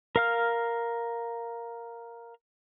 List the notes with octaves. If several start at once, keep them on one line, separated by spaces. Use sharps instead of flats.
A#4 F5 F6